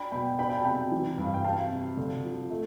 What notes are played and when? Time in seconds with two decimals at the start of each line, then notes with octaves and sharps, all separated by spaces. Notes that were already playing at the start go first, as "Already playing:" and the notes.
Already playing: D4 G5 B5
0.12 B2 G5 B5
0.39 D4 G5 B5
0.50 G5
0.57 A5
0.65 C3 G5 B5
0.92 E3
1.18 G2
1.23 F5
1.34 G5
1.44 C3 F5 A5
1.72 C3
1.97 D3
2.24 F3
2.50 A3